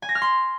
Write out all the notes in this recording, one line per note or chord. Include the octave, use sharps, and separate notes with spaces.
G#5
A#6
F6
C6